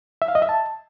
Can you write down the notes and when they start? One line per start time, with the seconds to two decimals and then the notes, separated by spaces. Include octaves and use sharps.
0.22 E5
0.28 F5
0.35 D#5
0.42 E5
0.49 A5